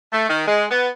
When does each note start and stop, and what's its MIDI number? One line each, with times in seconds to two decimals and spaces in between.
0.13 0.28 57
0.29 0.43 51
0.47 0.65 56
0.71 0.88 59